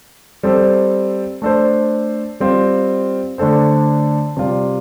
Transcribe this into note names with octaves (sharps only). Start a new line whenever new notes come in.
G3 C4 A4 C5
A3 D4 A4 C5
G3 C4 F4
D3 A3 D4 A4 C5
C3 G3 F4 D5